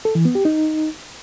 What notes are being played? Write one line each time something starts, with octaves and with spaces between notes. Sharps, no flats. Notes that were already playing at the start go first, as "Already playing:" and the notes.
A4
E3
B3
G4
D#4